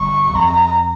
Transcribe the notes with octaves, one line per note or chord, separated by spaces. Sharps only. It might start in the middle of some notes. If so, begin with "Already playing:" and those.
Already playing: G1 G2 C#6
E2
F2 A#5